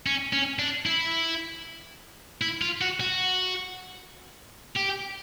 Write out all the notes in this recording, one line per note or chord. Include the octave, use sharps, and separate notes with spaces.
C#4
C#4
D4
E4
E4
F4
F#4
F#4
G4